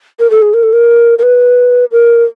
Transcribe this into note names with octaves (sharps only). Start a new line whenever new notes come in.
A#4
A4
G#4
A#4
A4
A#4
A#4
B4
A#4